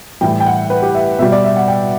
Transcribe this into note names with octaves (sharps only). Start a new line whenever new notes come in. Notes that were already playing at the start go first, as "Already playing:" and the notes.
A2 E3 G3 G5
G5
F#5
B4
G4
E5
B2 G3 E5
D5
E5
F#5
G5